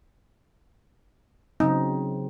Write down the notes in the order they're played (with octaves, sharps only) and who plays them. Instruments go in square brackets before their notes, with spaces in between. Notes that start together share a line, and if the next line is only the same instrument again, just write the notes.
[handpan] C#3 F#3 C4 [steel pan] D#4